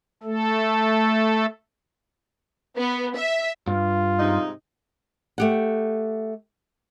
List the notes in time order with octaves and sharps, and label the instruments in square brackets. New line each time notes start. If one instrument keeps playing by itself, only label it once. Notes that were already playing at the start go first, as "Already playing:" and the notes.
[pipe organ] A3 A4
[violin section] B3
E5
[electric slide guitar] G2 [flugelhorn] F4
[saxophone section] G#2 C3 D#4
[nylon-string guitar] A3 G4 F#5